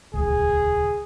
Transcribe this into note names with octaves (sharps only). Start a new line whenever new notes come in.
D#1 C#2 G#4